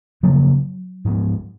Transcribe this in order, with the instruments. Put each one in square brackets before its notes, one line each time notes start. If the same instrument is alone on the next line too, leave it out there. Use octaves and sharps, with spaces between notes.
[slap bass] F#2 C#3 F3 A#3 [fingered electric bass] F#3
[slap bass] G#2 F3 G#3 B3